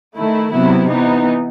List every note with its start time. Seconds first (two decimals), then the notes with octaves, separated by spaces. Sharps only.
0.16 D#3 A3 E4
0.52 C3 F#3 B3 E4
0.89 E3 B3 D#4